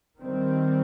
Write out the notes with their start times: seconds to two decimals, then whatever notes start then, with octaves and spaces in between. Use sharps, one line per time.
0.19 D#3 G3 C4